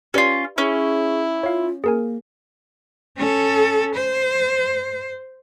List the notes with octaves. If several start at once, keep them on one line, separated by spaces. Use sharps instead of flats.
C#4 F4 G4 B4 D5
C#4 E4 G#4
F4 C#5 F5
A#3 G#4 A#4 G#5
C#4 A4
C5